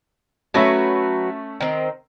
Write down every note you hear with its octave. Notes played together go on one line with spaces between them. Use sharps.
F#3 A3 C#4 F#4 B4 E5
D#3 C4